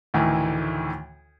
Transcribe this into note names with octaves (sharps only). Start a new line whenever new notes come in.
D2 A2 D#3 E3